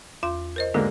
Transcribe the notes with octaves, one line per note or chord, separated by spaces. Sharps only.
E2 F4 C6
A#4 C5 D#5
G#2 D3 A#3 F#4